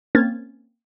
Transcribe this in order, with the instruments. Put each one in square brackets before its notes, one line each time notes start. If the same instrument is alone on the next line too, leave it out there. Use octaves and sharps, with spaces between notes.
[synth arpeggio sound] A#3 C4 C#4 F6 G#6 A6